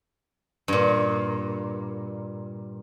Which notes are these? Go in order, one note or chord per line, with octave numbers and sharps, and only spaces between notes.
G2 A#2